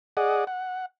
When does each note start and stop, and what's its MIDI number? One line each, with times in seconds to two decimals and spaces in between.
0.17 0.44 68
0.17 0.44 74
0.17 0.44 75
0.17 0.44 78
0.47 0.86 78